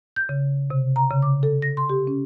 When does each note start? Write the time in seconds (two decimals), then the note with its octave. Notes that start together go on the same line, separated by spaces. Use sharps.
0.16 G6
0.29 C#3
0.70 C3
0.96 A#5
1.10 C#3
1.22 D6
1.43 A4
1.62 A#6
1.77 C6
1.90 G4
2.07 C#4